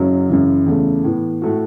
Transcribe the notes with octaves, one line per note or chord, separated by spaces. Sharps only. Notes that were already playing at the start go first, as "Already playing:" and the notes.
Already playing: F#1 F#2 C#3 F#3
F#2 C#3 E3
E2 C#3 A3
A2 E3 B3
A2 A3 F#4